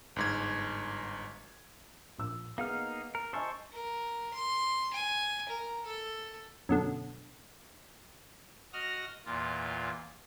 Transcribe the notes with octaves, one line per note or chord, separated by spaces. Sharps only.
G1 G#2 G#6
A#1 E6
A#3 B3 D#4 G#4 F5 F6
A#4
C5 D#5 G#5 A5 C#6 E6
A#4
C6
G#5
A#4
A4
F#2 B2 D3
F#4 D#5 F6 A#6
E2 A#2 F4